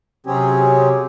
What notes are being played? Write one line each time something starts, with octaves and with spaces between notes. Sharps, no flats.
C3 F#3 C4 C#4 G4 G#4